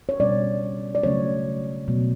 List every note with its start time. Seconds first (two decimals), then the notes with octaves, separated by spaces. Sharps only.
0.09 C#5
0.20 B2 G3 C#4 D5
0.95 D5
1.03 C#3 F#3 A3 C#4 C#5
1.88 B2 F#3 A3